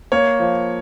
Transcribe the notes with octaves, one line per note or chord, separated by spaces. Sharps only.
A#3 C#5
F3